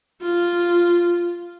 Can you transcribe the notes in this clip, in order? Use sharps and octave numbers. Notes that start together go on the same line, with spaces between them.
F4